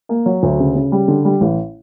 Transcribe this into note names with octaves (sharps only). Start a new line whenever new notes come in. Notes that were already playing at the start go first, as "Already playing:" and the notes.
A#3
F#3
D2
C#3
C#3
G3
D3
G3
A1